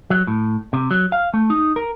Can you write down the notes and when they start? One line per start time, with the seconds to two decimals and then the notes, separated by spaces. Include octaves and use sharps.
0.10 F#3
0.27 A2
0.73 C3
0.91 F#3
1.12 F5
1.34 A3
1.50 D#4
1.76 A#4